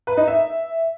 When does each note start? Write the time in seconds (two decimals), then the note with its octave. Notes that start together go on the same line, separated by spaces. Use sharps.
0.07 B4
0.17 D#4
0.28 E5